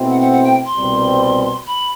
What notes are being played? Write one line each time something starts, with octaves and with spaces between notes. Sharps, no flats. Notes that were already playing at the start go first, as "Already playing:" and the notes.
Already playing: B2 A3 C4 E4
F#5
F#5
F#5
G5
C6
C2 B2 G3 C4
B5